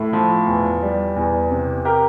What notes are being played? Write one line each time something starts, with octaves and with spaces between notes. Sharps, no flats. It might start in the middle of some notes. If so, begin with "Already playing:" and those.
Already playing: A2 A3
F3
E2
G3
E2
C3
G4 A#4